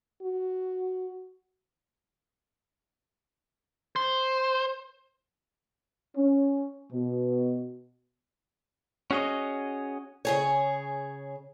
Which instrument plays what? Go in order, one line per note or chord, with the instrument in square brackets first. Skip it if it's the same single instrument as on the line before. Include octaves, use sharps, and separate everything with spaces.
[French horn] F#4
[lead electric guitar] C5
[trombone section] C#4
B2
[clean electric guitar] C#4 F#4 G#4 C#5 D#5
[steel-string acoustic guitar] C#3 G#4 C#5